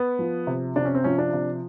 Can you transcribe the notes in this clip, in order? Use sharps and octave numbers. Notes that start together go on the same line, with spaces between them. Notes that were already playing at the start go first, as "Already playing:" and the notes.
Already playing: B3
F3
C3
C3 D4
C#4
C4
F3 C#4
D4
C3